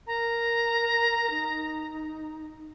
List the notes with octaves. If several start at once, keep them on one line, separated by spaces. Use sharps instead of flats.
A#4 A#5
D#4